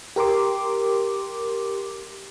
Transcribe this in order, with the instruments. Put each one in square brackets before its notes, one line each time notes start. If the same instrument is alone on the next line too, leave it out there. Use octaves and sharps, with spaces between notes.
[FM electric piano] G4 A#4 C6 D6